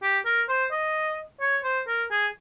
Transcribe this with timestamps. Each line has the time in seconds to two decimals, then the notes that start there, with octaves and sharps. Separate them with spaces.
0.02 G4
0.25 A#4
0.49 C5
0.72 D#5
1.41 C#5
1.64 C5
1.88 A#4
2.11 G#4